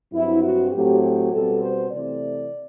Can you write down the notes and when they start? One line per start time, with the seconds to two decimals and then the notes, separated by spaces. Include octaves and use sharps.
0.12 G2 F#3 C4 E4
0.43 F#4
0.72 A2 F#3 A3 C4 G4
1.02 G4
1.31 B2 G3 C4 A4
1.61 C5
1.91 C3 E3 A3 D5